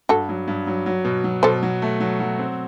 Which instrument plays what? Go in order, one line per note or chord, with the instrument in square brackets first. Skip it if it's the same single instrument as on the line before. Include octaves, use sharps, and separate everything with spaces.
[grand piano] G2 [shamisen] F#4 A4
[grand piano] F#3
G2
F#3
F#3
B2
F#3
[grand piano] B2 [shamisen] A4 C5
[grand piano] F#3
A3
F#3
F#3
C4